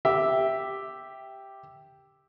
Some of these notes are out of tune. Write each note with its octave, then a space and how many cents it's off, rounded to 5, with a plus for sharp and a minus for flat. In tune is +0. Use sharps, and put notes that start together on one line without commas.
G4 +0 E5 +0